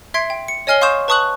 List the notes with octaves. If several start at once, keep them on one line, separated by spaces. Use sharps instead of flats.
E5 C6 G#6 C7 D7
G5
C#7
C#5 D#5 G#5 F6 C7 G7
F5 C6 C#6 D#6 G6 E7
B4 A5 C#6 D#6 F#6 F#7